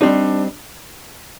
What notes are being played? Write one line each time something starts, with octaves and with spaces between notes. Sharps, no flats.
G3 C4 D4 D#4